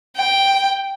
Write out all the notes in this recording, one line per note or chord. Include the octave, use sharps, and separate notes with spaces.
G5